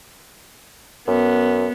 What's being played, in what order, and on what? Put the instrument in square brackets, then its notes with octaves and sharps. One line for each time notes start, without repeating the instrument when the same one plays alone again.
[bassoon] F#2 [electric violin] B3